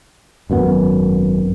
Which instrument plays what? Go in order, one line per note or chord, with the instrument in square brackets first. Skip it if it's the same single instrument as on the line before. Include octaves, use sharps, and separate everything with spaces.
[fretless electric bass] G#1 F#2 D#3 B3